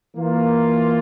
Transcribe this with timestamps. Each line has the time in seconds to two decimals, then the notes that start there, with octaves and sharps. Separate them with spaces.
0.15 E3 A#3 F4